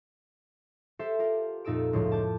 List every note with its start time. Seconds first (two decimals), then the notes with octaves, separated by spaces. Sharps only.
0.99 G4 A4 C5 E5
1.19 F4 G4 A#4
1.65 F2 A#2 D#4 A4 E6 D7
1.93 C#2 A2 F3
2.12 A5 D6 G6